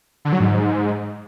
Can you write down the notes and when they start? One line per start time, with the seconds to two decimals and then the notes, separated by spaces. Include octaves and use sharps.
0.25 D3
0.32 F#3
0.40 G#2